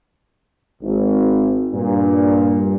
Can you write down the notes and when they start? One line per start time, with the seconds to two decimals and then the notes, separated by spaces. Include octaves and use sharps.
0.82 G#1
1.73 G2 A#2